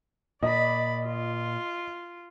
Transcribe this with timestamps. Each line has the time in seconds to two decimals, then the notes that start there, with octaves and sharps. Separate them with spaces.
0.43 A#2 D5 D#5 B5
1.06 F4